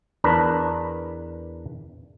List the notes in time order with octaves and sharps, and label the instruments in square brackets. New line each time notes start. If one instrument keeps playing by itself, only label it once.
[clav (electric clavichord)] E2 D4 A#4 B4